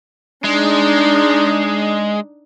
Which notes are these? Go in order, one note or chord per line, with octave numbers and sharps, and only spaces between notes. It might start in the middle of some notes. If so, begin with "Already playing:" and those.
G#3 D4 D#4